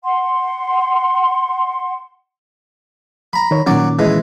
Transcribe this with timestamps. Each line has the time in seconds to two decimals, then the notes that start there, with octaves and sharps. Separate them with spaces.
0.04 F#5 C6
3.33 A#5 B5
3.51 D#3 C#5
3.67 A#2 D#3 F#3 C#4 D5
3.99 E3 G#3